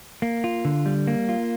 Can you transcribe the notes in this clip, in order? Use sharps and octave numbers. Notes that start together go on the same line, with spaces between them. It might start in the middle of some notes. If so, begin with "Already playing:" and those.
A#3
F4
D3
G3
A#3
F4